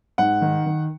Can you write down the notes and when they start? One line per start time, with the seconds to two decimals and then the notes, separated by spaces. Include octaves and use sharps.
0.18 G#2 F#5
0.42 D#3
0.66 D#3